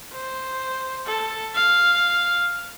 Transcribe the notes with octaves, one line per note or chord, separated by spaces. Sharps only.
C5
A4
F5